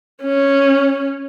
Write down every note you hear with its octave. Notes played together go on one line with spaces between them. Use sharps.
C#4